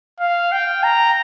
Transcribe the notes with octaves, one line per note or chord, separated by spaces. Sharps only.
F5
G5
A#5